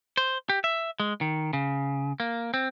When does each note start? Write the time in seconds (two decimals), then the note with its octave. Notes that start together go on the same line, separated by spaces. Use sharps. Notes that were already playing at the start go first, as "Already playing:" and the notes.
0.17 C5
0.49 G4
0.64 E5
1.00 G#3
1.21 D#3
1.53 C#3
2.20 A#3
2.54 C4